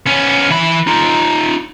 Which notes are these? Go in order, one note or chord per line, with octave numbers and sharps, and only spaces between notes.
B3 C#4
E3 B5
D#4 F4